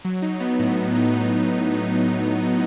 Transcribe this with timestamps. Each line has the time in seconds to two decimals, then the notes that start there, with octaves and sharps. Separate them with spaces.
0.05 F#3
0.22 D#4
0.40 B3
0.59 A2
0.77 F#3
0.95 D#4
1.13 B3
1.31 A2